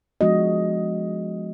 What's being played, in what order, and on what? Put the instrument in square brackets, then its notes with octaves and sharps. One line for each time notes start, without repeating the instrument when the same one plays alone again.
[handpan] F3 G#3 B3 D4 F#4 D#5